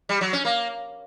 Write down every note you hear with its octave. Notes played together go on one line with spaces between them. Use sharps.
G3
F#3
C#4
A#3